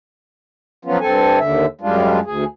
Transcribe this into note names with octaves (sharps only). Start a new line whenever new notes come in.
F3 F#3 B3 C#4 F4
G2 C4 A4 G#5
D#2 D3 E5
F#2 G3 G#3 D4 F4
D2 G#4